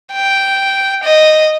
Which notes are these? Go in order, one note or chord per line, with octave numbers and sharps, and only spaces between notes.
G5
D#5